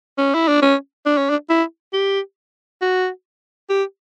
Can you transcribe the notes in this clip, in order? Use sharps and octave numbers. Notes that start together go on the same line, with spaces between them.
C#4
E4
D4
C#4
D4
C#4
D4
E4
G4
F#4
G4